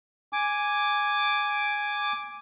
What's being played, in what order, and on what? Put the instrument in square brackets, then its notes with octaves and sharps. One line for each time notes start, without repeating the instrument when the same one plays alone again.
[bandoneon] G#5 D6